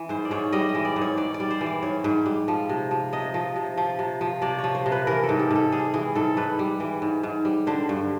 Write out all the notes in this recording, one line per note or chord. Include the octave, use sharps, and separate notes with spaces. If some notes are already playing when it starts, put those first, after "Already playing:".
Already playing: E3
G#2 C5
D5
G#2 C#5
G3 D#5
D#5
E3
D5
G#2
C#5
G#2 D5
D5
G3
C5
E3
D5
G#2 C#5
G#2
G3
F3
C3
F3
C3 D#5
F3
C3
F3
C3
F3
C3 D5
C#5
F3
C5
C3
B4
E3 A#4
A4
G#2
G4
G#2
A4
G3 G#4
E3 G#4
G#2 A4
G#2 B4
G3
E3
G#2
G#2
G3
D3 C5
G2